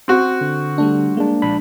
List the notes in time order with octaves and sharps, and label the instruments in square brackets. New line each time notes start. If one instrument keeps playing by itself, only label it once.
[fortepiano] C4 F#4
[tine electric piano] D3
[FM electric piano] G3 A3 D4
[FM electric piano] G#3 [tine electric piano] A#3 D4
[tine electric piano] A#1 D4 B5